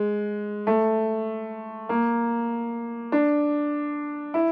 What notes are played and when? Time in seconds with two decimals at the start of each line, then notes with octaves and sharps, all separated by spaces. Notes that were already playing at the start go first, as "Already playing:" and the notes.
Already playing: G#3
0.67 A3
1.89 A#3
3.12 D4
4.34 E4